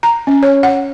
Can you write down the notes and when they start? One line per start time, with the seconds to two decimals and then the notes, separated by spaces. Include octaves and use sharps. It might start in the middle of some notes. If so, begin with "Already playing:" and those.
0.03 A#5
0.27 C#4
0.43 C#5
0.63 F#5